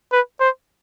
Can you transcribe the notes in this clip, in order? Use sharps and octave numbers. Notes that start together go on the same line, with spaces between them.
B4
C5